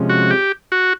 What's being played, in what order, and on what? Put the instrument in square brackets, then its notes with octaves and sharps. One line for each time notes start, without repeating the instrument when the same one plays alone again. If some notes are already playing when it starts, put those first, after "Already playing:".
Already playing: [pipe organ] C3 F3 G#3 C#4
[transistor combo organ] F#4
G4
F#4